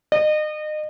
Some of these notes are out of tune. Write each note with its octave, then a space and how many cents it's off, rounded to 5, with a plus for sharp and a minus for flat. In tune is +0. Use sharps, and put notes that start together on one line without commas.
D#5 -30